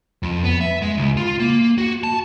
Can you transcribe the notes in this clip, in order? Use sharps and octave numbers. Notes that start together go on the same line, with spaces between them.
F2
B3
E5
G#3
C#2
F4
A#3
F#4
A5